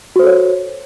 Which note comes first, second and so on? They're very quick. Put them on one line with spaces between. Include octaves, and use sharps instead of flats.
F#4 C5 A4 C#5